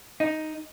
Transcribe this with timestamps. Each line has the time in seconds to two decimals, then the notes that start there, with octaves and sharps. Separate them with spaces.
0.20 D#4